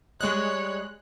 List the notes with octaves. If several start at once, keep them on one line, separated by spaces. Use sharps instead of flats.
G3 G#3 G4 C#5 D#5 F#6